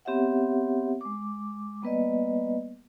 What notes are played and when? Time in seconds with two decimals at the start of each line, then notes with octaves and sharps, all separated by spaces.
0.05 B3 C4 G4 C#5 E5 F#5
1.01 G#3 D6
1.82 G3 A#3 B3 B4 D5 D#5